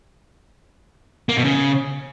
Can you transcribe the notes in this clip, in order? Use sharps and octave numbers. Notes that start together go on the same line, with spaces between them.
A#3
B2
C#3